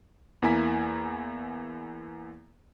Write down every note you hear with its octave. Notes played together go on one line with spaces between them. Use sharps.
E2 A#3 E4 G#5 A#5 B6